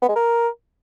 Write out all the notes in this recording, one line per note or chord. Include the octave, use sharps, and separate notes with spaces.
B3
G#3
A#4